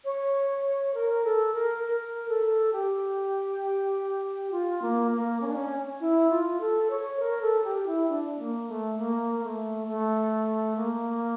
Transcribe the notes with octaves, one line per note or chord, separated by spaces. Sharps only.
C#5
A#4
A4
A#4
A#4
A4
G4
F4
A#3
A#3
C#4
D4
C#4
E4
F4
A4
C#5
A#4
A4
G4
E4
D4
A#3
A3
A#3
A3
A3
A#3